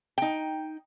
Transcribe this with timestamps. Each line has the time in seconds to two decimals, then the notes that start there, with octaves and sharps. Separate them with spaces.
0.18 D#4 G5